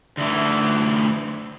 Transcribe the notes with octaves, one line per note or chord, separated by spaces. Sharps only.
D2 E3